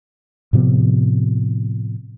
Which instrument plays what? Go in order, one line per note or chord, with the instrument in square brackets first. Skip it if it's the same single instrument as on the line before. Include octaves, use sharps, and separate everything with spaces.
[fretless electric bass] A2 C3 F3 B3